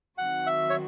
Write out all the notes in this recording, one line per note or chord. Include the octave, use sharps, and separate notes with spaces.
D#3 F#3 C4 F#4 F#5
E5
C#5